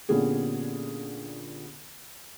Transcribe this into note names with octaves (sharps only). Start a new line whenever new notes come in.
A#2 D3 B3 C#4 G4 G#4